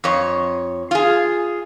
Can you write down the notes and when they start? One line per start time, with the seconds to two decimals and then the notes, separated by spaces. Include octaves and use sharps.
0.04 F2 C#5
0.91 F4 G#4